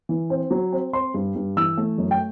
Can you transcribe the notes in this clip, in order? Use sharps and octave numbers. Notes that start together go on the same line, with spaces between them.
E3
C4
F#3
C4
C4 C6
G2
G2
E3 E6
A3
F#2
G5